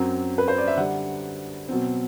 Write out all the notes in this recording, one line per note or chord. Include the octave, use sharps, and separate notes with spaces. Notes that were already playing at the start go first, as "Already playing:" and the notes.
Already playing: F#2 F#3 C4
B4
C5
D5
E5
D3 G3 D4 F#5
B2 F#3 C4